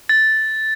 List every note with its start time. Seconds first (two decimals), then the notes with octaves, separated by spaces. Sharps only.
0.09 A6